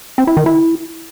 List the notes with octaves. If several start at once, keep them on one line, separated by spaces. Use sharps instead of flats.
C4
E4
D#3
E4